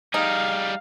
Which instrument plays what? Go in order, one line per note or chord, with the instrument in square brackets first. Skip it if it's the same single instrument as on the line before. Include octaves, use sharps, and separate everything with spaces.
[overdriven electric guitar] G3 G#4 [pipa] D#4 [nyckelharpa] F5